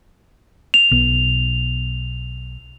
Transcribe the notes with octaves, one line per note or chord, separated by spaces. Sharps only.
F7
B1 B3